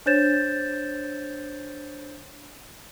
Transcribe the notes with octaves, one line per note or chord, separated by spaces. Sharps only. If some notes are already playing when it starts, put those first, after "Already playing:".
D4 C5 C#5 G6 A6 E7